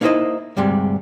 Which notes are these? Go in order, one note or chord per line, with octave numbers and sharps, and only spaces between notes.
A#3 D#4 E4 G#4 C5 D#5
D2 G2 C3 G3 G#3